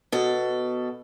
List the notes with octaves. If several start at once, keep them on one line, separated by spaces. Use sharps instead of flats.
B2 A4